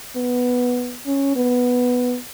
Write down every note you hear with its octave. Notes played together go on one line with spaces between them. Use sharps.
B3
C#4
B3